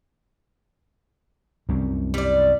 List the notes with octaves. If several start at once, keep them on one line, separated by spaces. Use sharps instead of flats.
C2 F#2 C3
G3 D5